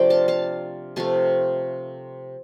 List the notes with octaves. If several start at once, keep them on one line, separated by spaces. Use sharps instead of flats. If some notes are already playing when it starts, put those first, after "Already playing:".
Already playing: C3 F3 A3 D4 C5 D5 G5
F5 A5
F5 A5
C3 F3 A3 F5 A5